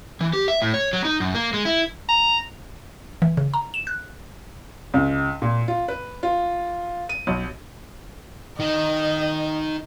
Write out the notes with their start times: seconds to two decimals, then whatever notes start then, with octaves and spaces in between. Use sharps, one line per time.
0.21 E3
0.33 G4
0.48 E5
0.62 A2
0.74 C#5
0.93 F#3
1.05 D#4
1.20 F#2
1.35 A#3
1.54 G#3
1.65 E4
2.09 A#5
3.22 E3
3.37 C#3
3.54 A#5
3.74 E7
3.87 F#6
4.94 C#2
5.42 A#2
5.68 F4
5.88 B4
6.23 F4
7.09 D#7
7.27 B1
8.60 D#3 D#5